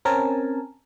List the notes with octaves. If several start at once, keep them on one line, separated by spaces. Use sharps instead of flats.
C4 C#4 A#4 G#5 A5